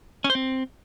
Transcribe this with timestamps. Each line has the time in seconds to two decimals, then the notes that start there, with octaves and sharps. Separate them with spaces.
0.24 C#4
0.30 C5
0.35 C4